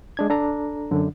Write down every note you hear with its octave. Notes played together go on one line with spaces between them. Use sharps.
G#3 D4 G#6
D4 A4 A#5
F#2 D3